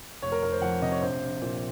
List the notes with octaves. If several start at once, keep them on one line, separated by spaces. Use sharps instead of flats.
F1 C#5
A#4
F1 A#4
C5
F2 F#5
C3 D#5
C#5
A#1 C5
A#1
A#2